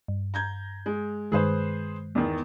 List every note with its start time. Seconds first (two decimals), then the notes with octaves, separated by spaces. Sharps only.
0.08 G2
0.34 A#5 G6 G#6
0.86 G#3
1.32 G2 D#3 G#3 G#4 B4 C5
2.15 E2 D#3